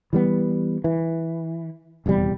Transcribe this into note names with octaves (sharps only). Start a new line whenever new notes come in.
E3 G3 B3
E3
D#1 E2 C3 G3